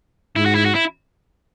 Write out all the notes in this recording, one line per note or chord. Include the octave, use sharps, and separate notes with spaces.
G#2 E4
F#4
E4
F#4
E4